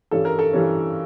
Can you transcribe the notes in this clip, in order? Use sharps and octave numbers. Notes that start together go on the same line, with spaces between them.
G2 E3 G3 C#4 A4
A#4
A4
G2 E3 G3 C#4